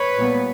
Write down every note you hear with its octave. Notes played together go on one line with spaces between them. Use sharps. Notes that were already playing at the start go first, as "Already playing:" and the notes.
Already playing: B4 C#5
A#2 G3 B3